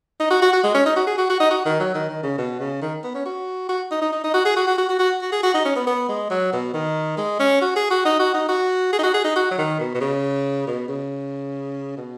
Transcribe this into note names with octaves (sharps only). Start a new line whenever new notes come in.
D#4
F#4
F#4
F#4
G#3
C#4
D#4
F#4
G#4
F#4
F#4
D#4
F#4
D#3
F#3
D#3
D#3
C#3
B2
C#3
D#3
B3
C#4
F#4
F#4
D#4
D#4
D#4
D#4
F#4
G#4
F#4
F#4
F#4
F#4
F#4
F#4
G#4
F#4
D#4
C#4
B3
B3
G#3
F#3
B2
D#3
G#3
C#4
F#4
G#4
F#4
D#4
F#4
D#4
F#4
G#4
D#4
F#4
G#4
D#4
F#4
F#3
D#3
B2
B2
C#3
B2
C#3
B2